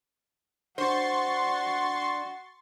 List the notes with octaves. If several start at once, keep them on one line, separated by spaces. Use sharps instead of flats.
D4 F#4 C5 C6 C#6 A6